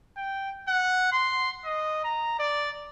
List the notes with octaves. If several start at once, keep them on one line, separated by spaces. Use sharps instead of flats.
G5
F#5
C6
D#5
A#5
D5